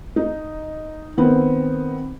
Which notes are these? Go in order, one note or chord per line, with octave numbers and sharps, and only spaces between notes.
D#4
D#3 B3 C4